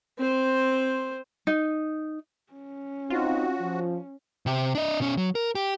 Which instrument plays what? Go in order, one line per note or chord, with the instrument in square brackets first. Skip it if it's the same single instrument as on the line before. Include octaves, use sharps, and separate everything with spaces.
[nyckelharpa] C4 C5
[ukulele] D#4
[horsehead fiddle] C#4
[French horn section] C4 D#4 [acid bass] F4 [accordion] F#4
[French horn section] F3
[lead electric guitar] C3 G4
D4 D#5
B2 C#4
F#3
A#4
G4